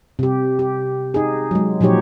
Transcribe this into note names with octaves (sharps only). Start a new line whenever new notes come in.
C3 G4
G4
D#4 G#4
F#3 G#3
A#2 F3 F#3 D#4 G4 C#5